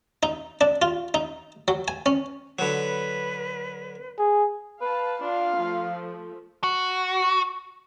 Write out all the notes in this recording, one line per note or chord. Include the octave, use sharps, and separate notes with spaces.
D#4
D4
F4
D#4
F#3
G#5
C#4
D3 F#3 B4
G#4
B4 F5 A5
D4 F4 F5
F3 A3
F#4